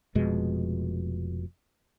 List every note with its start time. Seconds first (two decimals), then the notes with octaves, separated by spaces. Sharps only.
0.15 F1 F2 B2 G#3